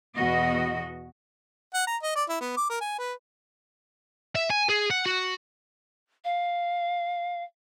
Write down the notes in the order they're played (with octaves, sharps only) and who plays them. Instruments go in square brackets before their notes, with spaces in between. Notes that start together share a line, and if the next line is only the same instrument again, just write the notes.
[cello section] E2 B2 F#4 D#5
[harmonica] F#5
A#5
D#5
D5
E4
B3
D6
A#4
G#5
B4
[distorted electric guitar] E5
G#5
G#4
F#5
F#4
[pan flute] F5